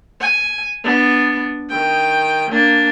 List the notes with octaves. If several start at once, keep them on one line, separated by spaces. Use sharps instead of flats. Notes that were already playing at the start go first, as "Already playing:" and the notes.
G#5
B3 D4
D#3 G5
A#3 D4